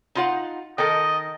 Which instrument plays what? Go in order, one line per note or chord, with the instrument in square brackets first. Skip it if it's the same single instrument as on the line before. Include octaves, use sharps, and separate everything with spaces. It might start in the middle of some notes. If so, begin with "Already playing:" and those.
[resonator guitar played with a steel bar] D#4 F4 F#5
[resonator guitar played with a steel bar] D#3 [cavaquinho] A4 A#4 G5 [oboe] D#5